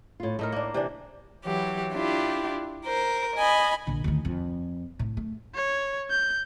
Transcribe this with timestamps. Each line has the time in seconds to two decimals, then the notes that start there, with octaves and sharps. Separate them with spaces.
0.20 A2 F4
0.39 A2 A3 D#4 A#4
0.52 A#3 D4
0.74 C3 E3 D4
1.44 E3 F#3 G4
1.92 D4 E4 F4 G4
2.84 A#4 C5
3.36 D#5 G#5 B5
3.87 A#1 D3
4.04 D2 D#3
4.25 F2
4.99 A2
5.17 A3
5.55 C#5
6.11 G6